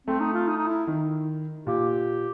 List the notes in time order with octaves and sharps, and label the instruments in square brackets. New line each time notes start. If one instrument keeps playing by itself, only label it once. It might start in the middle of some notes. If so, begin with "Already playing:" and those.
[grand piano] A3 [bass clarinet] C4
[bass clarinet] D#4
F4
D#4
D#4
E4
[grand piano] D#3
[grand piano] A#2 [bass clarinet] G4